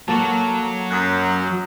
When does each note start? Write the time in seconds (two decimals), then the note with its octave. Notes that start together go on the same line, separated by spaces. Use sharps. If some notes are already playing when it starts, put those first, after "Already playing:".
0.08 F#3 A#3 F#4 A4 A#4 A5 A6
0.91 F#2 D#6 F#6